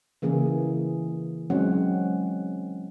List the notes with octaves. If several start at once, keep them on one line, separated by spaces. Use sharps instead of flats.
C#3 E3 A#3 G#4
F#3 G#3 C4 C#4 F#5